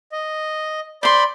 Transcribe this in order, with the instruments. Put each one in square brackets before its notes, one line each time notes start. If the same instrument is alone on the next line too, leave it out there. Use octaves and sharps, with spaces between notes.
[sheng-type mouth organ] D#5
[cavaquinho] C5 C6 [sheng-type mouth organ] D5 B5